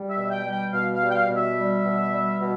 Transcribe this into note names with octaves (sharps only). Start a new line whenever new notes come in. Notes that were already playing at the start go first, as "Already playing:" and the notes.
Already playing: G3
E5
B2
G5
G3
G5
B2 F5
F5
G3
G5
F5
B2
E5
G3
B2
G3
B2